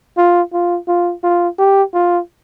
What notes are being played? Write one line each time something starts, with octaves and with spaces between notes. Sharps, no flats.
F4
F4
F4
F4
G4
F4